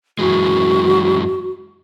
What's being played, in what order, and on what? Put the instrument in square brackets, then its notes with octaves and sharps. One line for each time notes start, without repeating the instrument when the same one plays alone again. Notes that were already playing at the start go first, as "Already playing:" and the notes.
[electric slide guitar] F#2 E3 G#3 [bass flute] F#4